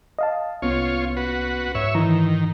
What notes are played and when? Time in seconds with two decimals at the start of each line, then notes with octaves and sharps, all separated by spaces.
0.19 D#5 F5 A5
0.62 C2 B3 C#4 F4 C#5
1.17 F#4 B4
1.75 G#2 C#5 E5
1.95 D#3 E3 A#5